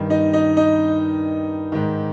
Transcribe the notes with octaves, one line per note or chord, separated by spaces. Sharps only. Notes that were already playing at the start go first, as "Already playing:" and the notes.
Already playing: G2 D#3
D#4 D#5
D#4 D#5
D#4 D#5
G#2 D#3